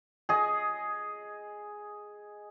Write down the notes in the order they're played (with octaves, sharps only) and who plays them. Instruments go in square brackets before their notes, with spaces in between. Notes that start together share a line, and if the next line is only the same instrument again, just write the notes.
[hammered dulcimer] G#4 D#5